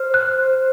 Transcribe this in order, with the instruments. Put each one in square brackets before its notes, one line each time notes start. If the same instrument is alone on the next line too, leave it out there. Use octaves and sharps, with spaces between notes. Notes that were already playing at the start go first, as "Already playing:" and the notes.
Already playing: [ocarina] C5 [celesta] F6
[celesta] F#6